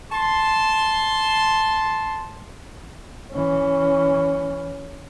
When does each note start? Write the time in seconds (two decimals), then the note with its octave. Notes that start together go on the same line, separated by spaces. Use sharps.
0.12 A5 C6
3.32 E3 C#4